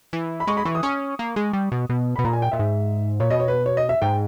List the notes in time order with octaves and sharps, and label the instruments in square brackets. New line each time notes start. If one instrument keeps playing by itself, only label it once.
[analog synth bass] E3
[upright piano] B5
[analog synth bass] G#3 [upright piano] C#6
[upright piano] B5
[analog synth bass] E3 [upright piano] C#6
[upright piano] D#6
[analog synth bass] C#4 [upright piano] C#6
[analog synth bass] A#3
G#3
G3
B2
B2
[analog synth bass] B2 [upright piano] B5
[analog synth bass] A#2 [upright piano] A#5
[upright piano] G#5
G5
[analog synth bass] A#2 [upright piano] E5
[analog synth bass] G#2
[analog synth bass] A#2 [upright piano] C#5
[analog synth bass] B2 [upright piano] D#5
[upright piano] C#5
B4
C#5
D#5
E5
[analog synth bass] G#2 [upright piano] G5